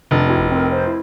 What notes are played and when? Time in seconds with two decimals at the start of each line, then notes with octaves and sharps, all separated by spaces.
0.11 F1 C3 D4 A6
0.26 C4 E4 F#4
0.38 G1
0.51 C4 A#4
0.72 C5
0.87 E4